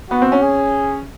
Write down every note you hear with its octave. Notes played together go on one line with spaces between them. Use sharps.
B3 F#4
C4
C#4
G#4